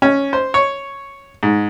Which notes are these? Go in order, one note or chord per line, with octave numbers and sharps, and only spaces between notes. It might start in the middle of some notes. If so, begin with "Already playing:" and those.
C#4
C5
C#5
G#2